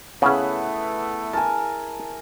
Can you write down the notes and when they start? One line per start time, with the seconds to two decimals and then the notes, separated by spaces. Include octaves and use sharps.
0.22 C#3 A3 B3 C#4 E4 G#4 B4 F#5
1.33 A#4 G#5 A5